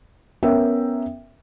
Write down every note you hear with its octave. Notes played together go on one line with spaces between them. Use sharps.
B3 C#4 A#4 E5 G5